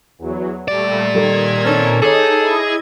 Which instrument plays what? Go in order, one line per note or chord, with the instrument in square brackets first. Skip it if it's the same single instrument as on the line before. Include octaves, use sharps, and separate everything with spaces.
[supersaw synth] E2 F#3
[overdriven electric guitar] A#2 D5 [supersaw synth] G3 A3
[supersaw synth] D#3 G#6 [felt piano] G3 A4
[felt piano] C4 D#4 [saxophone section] C#4 A4 A#4
[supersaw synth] D#4 [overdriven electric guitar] G#4 [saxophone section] A4 [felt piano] C#5 D6
[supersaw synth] E4 D#5 G#6